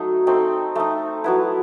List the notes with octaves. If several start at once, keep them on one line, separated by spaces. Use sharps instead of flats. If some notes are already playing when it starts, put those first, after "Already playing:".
Already playing: F#3 A3 D#4
A3 C4 D#4
A3 D#4
F#3 B3 E4